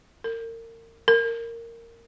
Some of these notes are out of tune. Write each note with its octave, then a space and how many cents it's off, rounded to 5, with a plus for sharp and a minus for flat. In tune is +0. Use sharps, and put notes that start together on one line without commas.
A#4 -35
A#4 -15